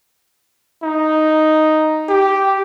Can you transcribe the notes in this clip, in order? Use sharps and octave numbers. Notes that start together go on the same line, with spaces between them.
D#4
G4